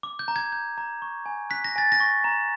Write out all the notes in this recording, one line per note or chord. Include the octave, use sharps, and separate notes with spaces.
D6
G6
A#5
G#6
G6
A#5
C#6
G#5
F#6 B6
A#6
G#5 A6
A#6
C#6
A#5